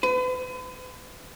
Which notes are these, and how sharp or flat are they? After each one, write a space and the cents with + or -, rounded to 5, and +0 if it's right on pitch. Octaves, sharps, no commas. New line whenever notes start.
B4 +40